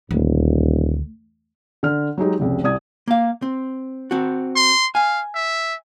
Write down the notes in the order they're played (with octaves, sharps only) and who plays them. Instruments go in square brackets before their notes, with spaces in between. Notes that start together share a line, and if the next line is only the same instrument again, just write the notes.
[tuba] D#1 [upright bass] D2
[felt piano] D3 F6
F#3 G#3 D#4 G4
F1 C#2 C3
C2 D5 D#6 G#6
[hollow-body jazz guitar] A#3 F5
C4
C4 F#4
[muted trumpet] C6
[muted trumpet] F5 [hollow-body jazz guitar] G#5
[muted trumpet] E5